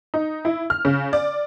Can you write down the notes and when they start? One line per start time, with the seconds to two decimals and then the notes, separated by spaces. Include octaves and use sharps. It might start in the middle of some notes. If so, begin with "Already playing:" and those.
0.14 D#4
0.45 E4
0.70 F6
0.85 C#3
1.13 D5